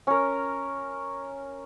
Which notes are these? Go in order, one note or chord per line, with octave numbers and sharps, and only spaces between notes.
C#4 A#4